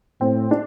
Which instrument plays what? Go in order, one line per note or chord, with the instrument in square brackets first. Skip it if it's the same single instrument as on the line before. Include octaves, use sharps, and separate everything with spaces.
[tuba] A2 [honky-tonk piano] C4
[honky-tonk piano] D4